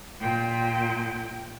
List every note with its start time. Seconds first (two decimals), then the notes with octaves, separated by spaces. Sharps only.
0.21 A#2 G5